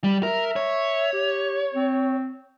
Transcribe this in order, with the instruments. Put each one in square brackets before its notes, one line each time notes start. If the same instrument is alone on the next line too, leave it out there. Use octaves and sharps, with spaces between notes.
[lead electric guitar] G3
[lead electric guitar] A#4 [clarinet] E5
[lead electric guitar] C#5
[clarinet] G4
C4